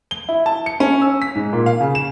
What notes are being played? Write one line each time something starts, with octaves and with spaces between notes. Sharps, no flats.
G7
E4
A5
C#7
C#4
E6
B6
G#2
A#2
F5
C#3
E7